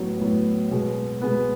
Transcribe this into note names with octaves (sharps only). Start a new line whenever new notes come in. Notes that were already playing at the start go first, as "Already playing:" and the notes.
Already playing: A2 F#3 B3
A2 F#3 B3
B2 G#3 B3
B2 G#3 B3